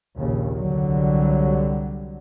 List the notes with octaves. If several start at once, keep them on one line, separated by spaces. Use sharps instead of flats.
A#1 D#2 C#3
C2 D3 F#3 G3